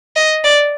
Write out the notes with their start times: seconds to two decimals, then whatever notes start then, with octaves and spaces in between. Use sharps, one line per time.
0.16 D#5
0.44 D5